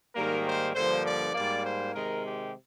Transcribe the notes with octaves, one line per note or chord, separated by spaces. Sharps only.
G#2 D#3 G3 A#3 A#4
C5
G2 D3 F3 A#3 C5
D5
G#2 G3 A#3 D5
C5
C3 D#3 G#3 A#4
G4